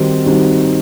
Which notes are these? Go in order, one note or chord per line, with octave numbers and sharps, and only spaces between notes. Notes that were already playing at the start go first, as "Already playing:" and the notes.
Already playing: D#3 G3 C4 D#4 F#4
D#3 G3 C4 D#4 F#4